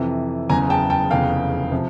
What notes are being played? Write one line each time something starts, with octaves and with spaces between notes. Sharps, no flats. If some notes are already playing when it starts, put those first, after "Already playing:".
Already playing: F2 C3 E3
F#1 E2 C#3 G#5 A#5
G5 A5
G5 A5
F1 E2 C#3 F5 G5
C3 F3